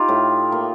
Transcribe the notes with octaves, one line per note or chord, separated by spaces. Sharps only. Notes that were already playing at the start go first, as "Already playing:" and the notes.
Already playing: D#4 F4 G4
A2
A#3